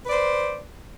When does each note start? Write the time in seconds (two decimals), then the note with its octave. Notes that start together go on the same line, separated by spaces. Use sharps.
0.04 B4
0.08 D5
0.12 C5